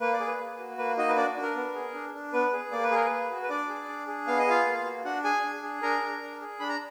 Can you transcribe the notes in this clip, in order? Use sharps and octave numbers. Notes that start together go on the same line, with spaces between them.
A#3 B4
D5
G#4
B4
A#3
F#4
A#3 B4
D#4 F#4 D#5
B4
D4 D5
D4
A#4
B3
G#4
D4
D4
B3 B4
G#4
A#3 D5
B4
G#4 A#4
B4
A#3
F#4
B4
D4 D5
G#4
D4
G#4
B3 F5
D#5
F4 G#4 F5
A#3
F#4
D4 F#4 F#5
G#4 G#5
D4
G#4
D4 A#4 A#5
D4
D4
G#4
D4 B5
A#5